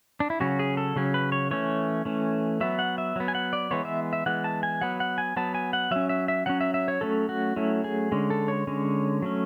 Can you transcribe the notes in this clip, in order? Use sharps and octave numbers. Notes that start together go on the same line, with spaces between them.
D4
E4
C#3 F#3 C#4 F#4
G#4
A4
C#3 F#3 C#4
B4
C#5
E3 A3 C#4 C#5
E3 A3 C#4
F#3 B3 E5
F#5
E5
F#3 B3
G#5
F#5
D5
E3 G#3 B3 C#5
E5
E5
E3 G#3 B3 F#5
A5
G#5
F#3 B3 F#5
F#5
G#5
F#3 B3 A5
G#5
F#5
F#3 C#4 E5
E5
E5
F#3 C#4 F#5
E5
E5
C#5
F#3 A3 C#4 A4
F#4
F#3 A3 C#4 E4
G#4
D3 G#3 C#4
A4
C#5
D3 G#3 C#4
F#3 A3 C#4